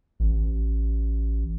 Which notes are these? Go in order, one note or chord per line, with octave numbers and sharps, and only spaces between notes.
A1